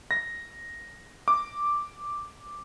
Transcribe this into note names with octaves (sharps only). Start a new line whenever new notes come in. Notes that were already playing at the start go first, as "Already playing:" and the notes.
A#6
D6